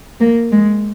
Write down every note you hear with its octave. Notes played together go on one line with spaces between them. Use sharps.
A#3
G#3